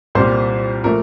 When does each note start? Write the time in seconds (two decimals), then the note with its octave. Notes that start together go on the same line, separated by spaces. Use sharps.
0.15 C2 A#2 G3 C5
0.84 A#2 F3 A3 A#4